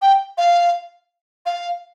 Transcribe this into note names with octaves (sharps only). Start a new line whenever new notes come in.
G5
F5
F5